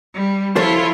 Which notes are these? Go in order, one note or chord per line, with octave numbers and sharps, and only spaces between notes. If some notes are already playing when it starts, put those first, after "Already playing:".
G3
F3 E4 F4 A4 C5 C#5